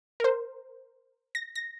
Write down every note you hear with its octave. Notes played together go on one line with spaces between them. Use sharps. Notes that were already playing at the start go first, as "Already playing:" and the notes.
A#4 C5
A#6
A#6